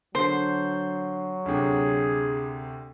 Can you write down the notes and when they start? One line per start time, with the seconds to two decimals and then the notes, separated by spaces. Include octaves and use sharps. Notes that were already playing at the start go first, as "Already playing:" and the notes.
0.15 D3 F#3 C5 C7
1.46 D2 C3 G#4